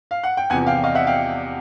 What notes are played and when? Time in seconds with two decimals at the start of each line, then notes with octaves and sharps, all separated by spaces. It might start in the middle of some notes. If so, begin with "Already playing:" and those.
0.11 F5
0.24 F#5
0.37 G5
0.50 E2 C3 F3 F#5 G#5
0.66 F5 G5
0.84 D#5 F5
0.95 E5 F#5
1.07 F5 G5